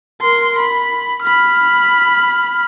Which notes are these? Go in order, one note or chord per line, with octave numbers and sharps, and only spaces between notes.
A#4 C6
B5
B5 F6